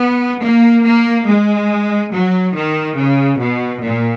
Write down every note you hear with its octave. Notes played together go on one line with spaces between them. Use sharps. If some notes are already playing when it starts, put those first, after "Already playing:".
Already playing: B3
A#3
A#3
G#3
F#3
D#3
C#3
B2
A#2